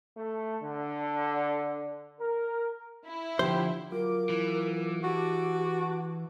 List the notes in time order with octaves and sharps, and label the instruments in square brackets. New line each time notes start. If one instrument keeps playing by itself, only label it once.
[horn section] A3
D3
A#4
[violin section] E4
[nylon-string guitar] D3 F3 [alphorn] G4 [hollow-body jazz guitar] C5
[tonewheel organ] F#3 F4 D6 [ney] A#4
[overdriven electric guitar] E3
[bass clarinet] F#4 [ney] G4 [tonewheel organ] A5 D6